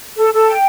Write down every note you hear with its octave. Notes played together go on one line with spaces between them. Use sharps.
A4
A4
G5